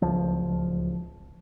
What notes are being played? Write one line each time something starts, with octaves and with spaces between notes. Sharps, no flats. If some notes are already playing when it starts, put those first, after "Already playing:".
D1 G1 C#2 F3